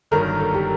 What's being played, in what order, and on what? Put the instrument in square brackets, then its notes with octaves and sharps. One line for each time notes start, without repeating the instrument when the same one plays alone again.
[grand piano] G1 G2 D#3 F#3 [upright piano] A#4
[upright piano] A4
G4